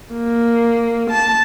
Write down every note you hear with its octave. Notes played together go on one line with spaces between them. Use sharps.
A#3
A5